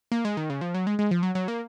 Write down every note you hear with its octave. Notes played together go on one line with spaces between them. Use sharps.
A#3
G#3
D#3
C#3
F3
F#3
G#3
G#3
F3
F#3
F#3
A#3